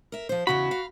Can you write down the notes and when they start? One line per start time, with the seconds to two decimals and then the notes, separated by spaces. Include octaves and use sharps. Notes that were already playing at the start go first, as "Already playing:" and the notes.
0.12 A#4 E5
0.29 F3 C5
0.47 E2 C#3 E4 F#4 B5
0.71 F5